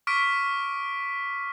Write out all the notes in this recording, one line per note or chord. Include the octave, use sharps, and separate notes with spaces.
C#6 D6 F6 B6 D7